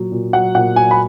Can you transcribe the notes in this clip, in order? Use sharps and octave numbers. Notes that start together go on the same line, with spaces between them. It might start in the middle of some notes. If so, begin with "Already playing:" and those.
Already playing: A#2 F#3
A#2
F#3 F#5
A#2 F#5
F#3 G#5
B5